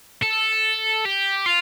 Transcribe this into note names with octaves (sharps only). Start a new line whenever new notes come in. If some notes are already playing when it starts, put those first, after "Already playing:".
A4
G4
F4